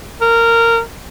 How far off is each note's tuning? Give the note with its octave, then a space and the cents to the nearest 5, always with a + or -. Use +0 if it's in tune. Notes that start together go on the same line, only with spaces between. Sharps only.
A#4 -15